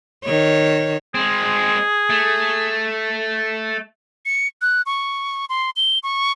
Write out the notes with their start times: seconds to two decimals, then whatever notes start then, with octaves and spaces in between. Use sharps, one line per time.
0.25 D#3 C#5
1.15 G#3 C4 G#4
2.10 A3
4.26 C#7
4.62 F#6
4.86 C#6
5.49 C6
5.76 G7
6.03 C#6